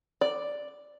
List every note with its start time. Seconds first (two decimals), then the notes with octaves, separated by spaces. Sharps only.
0.21 D5